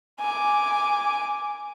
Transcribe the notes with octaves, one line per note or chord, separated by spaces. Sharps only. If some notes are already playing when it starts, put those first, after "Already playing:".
G#5 D6